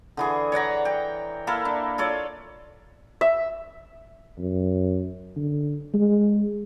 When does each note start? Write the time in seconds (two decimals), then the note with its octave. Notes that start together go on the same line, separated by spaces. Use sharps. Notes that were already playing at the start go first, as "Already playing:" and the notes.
0.17 D3 E3 G#4
0.52 C#5 D5 F#5 A#5
0.85 G5
1.47 A#3 E4 A4 A#4
1.65 D4
1.98 F4 A4 C#5 D5
3.21 E5
4.39 F#2
5.37 D3
5.94 G#3